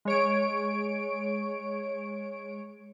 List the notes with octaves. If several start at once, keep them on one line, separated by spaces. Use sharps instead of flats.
G#3 C#5 D7